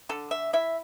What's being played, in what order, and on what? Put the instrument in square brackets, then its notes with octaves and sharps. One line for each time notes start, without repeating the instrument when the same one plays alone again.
[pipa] D3 A4
E5
E4 E5